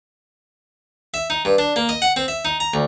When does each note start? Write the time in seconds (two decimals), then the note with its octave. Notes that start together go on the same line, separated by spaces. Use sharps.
1.14 E5
1.30 D#4
1.45 G2
1.58 D4
1.76 A#3
1.89 D#5
2.02 F#5
2.16 C4
2.28 E5
2.45 D#4
2.60 A#5
2.74 D2